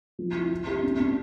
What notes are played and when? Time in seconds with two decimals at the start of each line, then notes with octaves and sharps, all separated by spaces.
0.19 F3
0.35 E4
0.52 E4
0.67 G4
0.83 D4
1.00 D4